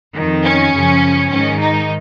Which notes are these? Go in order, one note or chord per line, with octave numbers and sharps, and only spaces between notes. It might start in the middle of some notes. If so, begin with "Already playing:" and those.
F2 D#3
C#4
F#2 C#3 F3
G#2 D#3 C#4
D#4